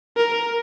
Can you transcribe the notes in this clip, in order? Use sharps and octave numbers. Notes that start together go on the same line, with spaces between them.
A#4